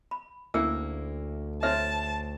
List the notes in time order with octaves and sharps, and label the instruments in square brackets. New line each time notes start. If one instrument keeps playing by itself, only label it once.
[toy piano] B5
[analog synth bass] D2 [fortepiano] A#3 E4 [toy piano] C#4 G5 E6
[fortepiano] C4 F6 [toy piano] D#4 C#5 E5 [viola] A5